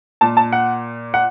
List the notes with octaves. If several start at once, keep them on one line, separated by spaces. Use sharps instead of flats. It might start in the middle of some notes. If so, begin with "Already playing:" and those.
A#2 A5
A5
F#5
F#5